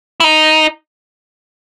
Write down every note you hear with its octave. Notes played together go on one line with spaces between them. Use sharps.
E4
D#4